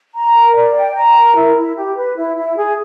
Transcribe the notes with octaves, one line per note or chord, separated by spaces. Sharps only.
A#5
A#4
D5
G5
A#5
A#4
E4
E4
G4
B4
E4
E4
G#4